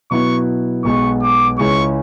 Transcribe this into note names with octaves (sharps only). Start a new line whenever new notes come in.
B2 F#3 B3 E4 C#6
B1 B2 G#3 B3 C#6
D6
C#2 C#3 G#3 C#4 E4 C#6